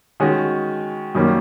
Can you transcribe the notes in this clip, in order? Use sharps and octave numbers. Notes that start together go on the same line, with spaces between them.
D#3 G#3 C#4 F#4
F#2 D#3 G3 A#3 C#4